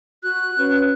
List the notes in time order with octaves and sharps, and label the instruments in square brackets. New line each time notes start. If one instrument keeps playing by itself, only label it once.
[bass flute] F#4 [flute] F#6
[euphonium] C#4 [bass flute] B4